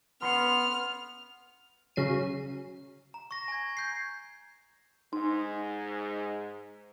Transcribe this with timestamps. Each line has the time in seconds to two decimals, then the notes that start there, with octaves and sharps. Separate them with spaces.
0.22 B3 C6 F6 C7 C#7
1.96 C#3 F#3 C7 D#7
3.14 A#5
3.31 C#6 A#6
3.48 G#5 G#6
3.77 G6 C7
5.13 G#2 D#4